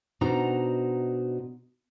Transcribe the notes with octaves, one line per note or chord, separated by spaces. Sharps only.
B2 D4 D#4 F#4 C5 A#5